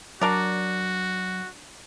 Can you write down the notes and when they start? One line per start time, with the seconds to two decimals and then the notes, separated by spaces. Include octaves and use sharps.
0.21 F#3 D4 F#4 A#4 D5